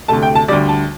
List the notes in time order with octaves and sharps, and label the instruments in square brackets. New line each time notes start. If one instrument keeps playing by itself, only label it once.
[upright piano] D2 C3 A3 A5
G5
A5
D2 D3 G3 D5
A5